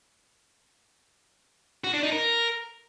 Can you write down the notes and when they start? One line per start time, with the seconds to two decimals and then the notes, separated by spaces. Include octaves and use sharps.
1.84 F#4
1.94 D4
2.03 D#4
2.12 A#4